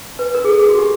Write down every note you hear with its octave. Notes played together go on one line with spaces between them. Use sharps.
B4
A#4
G#4
A4
G#4
F#4
G4